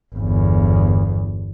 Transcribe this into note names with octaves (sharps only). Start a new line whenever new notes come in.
G1 E2